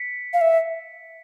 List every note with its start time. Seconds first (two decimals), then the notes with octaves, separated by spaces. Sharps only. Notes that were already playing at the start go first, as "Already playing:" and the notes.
Already playing: B6 C#7
0.33 F5
0.41 E5